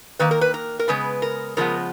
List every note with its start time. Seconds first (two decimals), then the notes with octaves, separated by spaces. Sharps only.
0.19 D#3 A#3 B4
0.31 A#4
0.41 B4
0.54 A#4
0.79 A#4
0.88 C#3 G#3 B3 B4
1.22 A#4
1.57 C#3 F3 G#3 B3 A#4